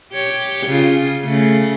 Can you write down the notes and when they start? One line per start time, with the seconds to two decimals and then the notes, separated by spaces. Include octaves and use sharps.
0.13 G4 C#5
0.67 C#3 F4
1.25 C#3 A3